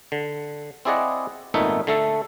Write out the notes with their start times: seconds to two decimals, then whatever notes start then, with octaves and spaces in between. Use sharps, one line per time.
0.12 D3
0.85 C4 E4 G#4 D5 D#5 F#5
1.54 G#1 A#2 A3 B3 D#4 E5
1.87 D3 A3 A4